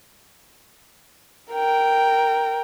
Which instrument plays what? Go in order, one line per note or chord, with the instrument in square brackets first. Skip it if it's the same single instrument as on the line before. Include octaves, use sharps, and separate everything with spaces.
[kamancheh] A#4 G5